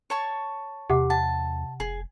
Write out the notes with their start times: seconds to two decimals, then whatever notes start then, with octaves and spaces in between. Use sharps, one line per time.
0.10 C#5 A5 C#6
0.90 E2 C3 G4 F#5 D6
1.10 F#5 A5
1.80 F1 G#4